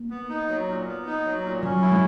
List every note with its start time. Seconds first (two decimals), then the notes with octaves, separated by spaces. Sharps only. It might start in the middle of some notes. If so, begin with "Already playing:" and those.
Already playing: A#3
0.10 B3
0.29 D#4
0.48 F#3
0.68 A#2
0.87 B3
1.06 D#4
1.25 F#3
1.43 A#2
1.63 F#3 C#4
1.82 E4
1.92 G#3